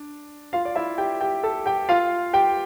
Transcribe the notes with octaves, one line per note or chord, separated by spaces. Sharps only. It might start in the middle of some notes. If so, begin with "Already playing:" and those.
Already playing: D4
F4 F5
D5
E4 E5
G4 G5
G4 G5
A4 A5
G4 G5
F4 F5
G4 G5